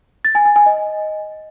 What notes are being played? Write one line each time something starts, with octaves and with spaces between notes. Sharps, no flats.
A6
G#5
G#5
G#5
D#5